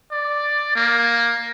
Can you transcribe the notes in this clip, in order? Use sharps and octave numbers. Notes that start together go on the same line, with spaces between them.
D5
A#3